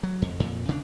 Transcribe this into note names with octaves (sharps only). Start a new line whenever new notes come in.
F#3
F2
F2 A#2
C#3 B3 D4